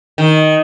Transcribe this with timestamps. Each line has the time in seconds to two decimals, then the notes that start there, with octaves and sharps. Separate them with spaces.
0.18 D#3